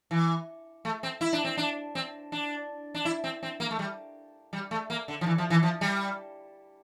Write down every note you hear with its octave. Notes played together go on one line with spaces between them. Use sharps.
E3
A3
C4
E4
D4
C4
D4
C4
D4
D4
E4
C4
C4
A#3
A3
G3
G3
A3
A#3
D3
F3
E3
F3
E3
F3
G3